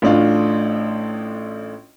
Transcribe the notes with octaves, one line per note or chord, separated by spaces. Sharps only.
A1 A2 D4 F4